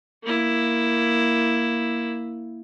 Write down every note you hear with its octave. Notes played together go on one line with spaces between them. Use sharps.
A#3 E4